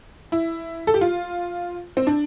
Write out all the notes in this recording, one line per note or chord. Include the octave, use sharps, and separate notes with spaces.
E4
A4
G4
F4
C4
D4